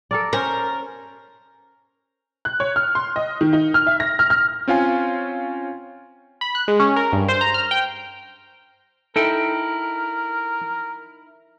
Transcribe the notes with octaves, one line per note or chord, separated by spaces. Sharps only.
A4 A#4 D5
C#4 A#4 C5
F#6
C#5
F6
C6
D#5
D#3
D#4
F6
E5
A#6
F6
F6
C4 C#4 F4 F5 G#5
B5
F#6
G#3
C#4
A#4
G2
C5
A#5
F6
G5
D#4 E4 A4 A#4 G5